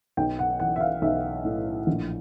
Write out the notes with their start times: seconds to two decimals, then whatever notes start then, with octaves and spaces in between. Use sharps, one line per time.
0.17 B1 G5
0.39 F#5
0.60 E3 F#5
0.76 E5
0.81 F5
1.02 B1 E5
1.45 A2
1.87 A#1